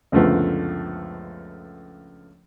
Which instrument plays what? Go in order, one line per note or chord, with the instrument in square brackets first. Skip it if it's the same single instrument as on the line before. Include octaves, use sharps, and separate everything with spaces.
[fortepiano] C#2 F#2 D3 F3 A3 B3